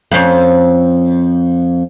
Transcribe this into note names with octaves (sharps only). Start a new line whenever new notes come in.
F2 C#4